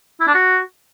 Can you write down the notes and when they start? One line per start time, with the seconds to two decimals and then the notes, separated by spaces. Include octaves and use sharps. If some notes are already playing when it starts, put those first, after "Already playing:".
0.21 E4
0.28 D4
0.35 F#4